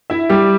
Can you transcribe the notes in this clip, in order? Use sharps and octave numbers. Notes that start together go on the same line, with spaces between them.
E4 E5
G3 G4